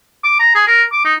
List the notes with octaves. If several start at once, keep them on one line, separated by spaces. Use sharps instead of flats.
D6
A#5
G#4
A#4
D6
D#4